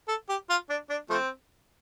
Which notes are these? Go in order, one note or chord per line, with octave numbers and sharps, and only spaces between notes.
A4
G4
F4
D4
D4
F3 A3 C4